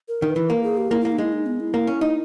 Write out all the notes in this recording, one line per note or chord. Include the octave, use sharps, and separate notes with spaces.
A#4
D#3
B4
E3
A#3 A#4
G#4
G4
A#3 E4
A#3 E4
D#4
G#3 E4
D#4
B3
E4
A#3
C#4
D#4